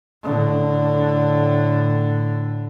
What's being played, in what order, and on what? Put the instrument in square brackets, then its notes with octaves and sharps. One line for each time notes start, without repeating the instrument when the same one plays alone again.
[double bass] A2 D3